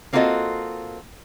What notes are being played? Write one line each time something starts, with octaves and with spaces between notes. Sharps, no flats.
A#3 C4 F4 F#4 A4 D#5